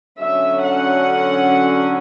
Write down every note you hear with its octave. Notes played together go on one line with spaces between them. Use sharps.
D3 F#3 C#4 E5
F#5